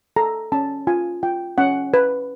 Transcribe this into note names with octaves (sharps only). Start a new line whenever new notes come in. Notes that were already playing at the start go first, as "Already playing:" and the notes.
A4 A#5
C#4 A5
F4 G#5
F4 G5
C#4 F#5
B4